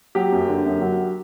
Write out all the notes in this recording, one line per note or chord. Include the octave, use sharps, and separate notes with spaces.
F#3 G4
F#2
D3
F#2
F#3